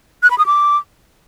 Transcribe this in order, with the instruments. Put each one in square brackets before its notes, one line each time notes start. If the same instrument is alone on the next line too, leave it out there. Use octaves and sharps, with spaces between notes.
[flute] F#6
B5
D#6
D6